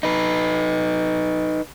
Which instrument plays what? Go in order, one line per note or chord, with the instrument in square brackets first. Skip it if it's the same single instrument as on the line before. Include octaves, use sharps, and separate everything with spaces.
[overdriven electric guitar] D#4 B4